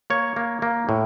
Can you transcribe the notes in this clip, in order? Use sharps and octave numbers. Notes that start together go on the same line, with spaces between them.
A#3 C#5
A#3
A#3
A2